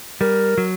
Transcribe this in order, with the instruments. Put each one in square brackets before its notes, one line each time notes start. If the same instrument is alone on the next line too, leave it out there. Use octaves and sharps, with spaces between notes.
[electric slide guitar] G3 [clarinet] A#4
[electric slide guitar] F#3